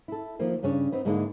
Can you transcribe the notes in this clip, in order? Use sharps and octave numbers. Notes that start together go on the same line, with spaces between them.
E4 A4
D#3 F3 A#3 F4
G2 C#3 C#4 D4 C#5
B3 C4 D#4
G#2 D3 G#3 A#3 D#4 E4